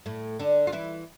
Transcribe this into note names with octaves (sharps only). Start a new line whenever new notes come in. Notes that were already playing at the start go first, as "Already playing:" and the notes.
A2 A3
D3 D4
F4
E3 E4